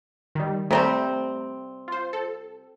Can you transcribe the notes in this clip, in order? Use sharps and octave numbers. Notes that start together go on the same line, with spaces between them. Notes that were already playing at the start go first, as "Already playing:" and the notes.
D#3 G3
C3 G3 A3 C4 A#5
F4 C5
A4